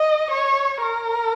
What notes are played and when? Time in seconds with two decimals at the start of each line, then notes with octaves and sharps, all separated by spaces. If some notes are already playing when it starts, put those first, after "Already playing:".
Already playing: D#5
0.31 C#5
0.82 A#4